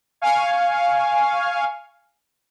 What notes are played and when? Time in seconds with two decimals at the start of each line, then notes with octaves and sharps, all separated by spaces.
0.21 F5 G#5 C#6